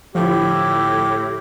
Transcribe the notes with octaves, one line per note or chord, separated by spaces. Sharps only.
A2 D3 F3 E4 G4